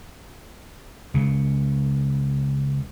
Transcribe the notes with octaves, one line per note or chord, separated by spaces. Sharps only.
C#2 C#3